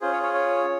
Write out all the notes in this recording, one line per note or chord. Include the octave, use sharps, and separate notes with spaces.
C#4 F4 G#4 C5
C#5
C#5
C#5